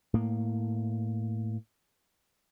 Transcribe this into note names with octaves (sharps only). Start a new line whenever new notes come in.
A2 A#3